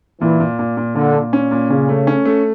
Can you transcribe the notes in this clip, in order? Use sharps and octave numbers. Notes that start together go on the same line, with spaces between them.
A#2 E3
A#2
A#2
A#2
A#2 D3
A#2
C#4
A#2
C#3 C#4
A3
C#4
A3